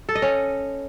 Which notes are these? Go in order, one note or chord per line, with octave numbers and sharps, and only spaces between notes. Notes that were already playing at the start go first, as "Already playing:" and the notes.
A4
D#5
C#4